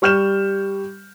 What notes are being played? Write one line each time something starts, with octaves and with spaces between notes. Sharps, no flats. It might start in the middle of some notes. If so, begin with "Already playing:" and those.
G3 C#6 F6 G6 E7